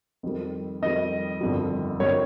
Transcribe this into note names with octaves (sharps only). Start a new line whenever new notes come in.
F2 D#3 G3
F2 D#3 G3 D#5
G1 F2 D#3 G3
G1 F2 D#3 G3 C#5